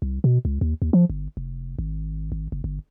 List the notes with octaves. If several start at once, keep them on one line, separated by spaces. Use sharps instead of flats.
C2
B2
C#2
D#2
D#2
F3
G1
F1
G#1
G#1
F#1
G1